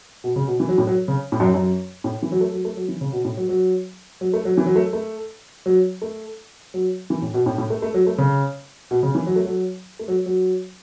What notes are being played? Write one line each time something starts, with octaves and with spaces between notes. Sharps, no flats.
B2
C#3
B2
E3
F#3
A2
F#3
C#3
A2
F#2
F#2
A2
E3
F#3
A3
F#3
A3
F#3
E3
C#3
B2
A2
F#3
F#3
F#3
A3
F#3
E3
F#3
A3
A3
F#3
A3
F#3
E3
A2
B2
A2
A2
A3
A3
F#3
A3
C#3
B2
C#3
E3
F#3
A3
F#3
A3
F#3
F#3